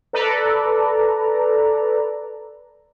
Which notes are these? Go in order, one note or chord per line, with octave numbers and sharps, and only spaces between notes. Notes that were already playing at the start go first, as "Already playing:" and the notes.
A4 B4 D5 A#5